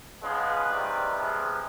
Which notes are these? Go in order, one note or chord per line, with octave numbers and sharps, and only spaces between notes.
C#3 F3 G#3 B3 B4
C3 D#3 G3
C3 F3 G#3